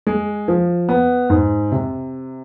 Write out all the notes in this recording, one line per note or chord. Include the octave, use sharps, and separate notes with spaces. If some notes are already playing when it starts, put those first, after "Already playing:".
G#3
F3
B3
G#2
C3